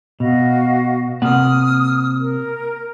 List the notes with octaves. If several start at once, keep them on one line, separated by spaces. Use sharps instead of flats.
B2 F#4 D#5 F5
C3 A#3 F#5 D#6 F6
A#4